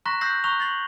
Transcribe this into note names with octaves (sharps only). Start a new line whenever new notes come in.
A#5 C6 C#6 F#6 A#6 B6
E6 F#6 G6 A#6 C7 F#7
A#5 C#6 E6 F#6 F7 G7
A6 C7 F#7